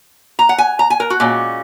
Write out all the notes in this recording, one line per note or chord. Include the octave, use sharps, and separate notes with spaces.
A#5
F#5
G#5
A#5
G#5
A#4
F#4
A#2 G#3 C#4